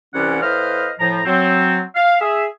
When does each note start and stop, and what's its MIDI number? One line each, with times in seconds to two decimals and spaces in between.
0.14 0.39 36
0.14 0.39 52
0.14 0.39 61
0.14 0.39 74
0.14 0.39 78
0.42 0.90 45
0.42 0.90 71
0.42 0.90 72
0.42 0.90 75
0.42 0.90 77
0.42 0.90 89
1.00 1.20 45
1.00 1.20 53
1.00 1.20 82
1.26 1.81 54
1.26 1.81 60
1.96 2.16 77
2.21 2.45 68
2.21 2.45 76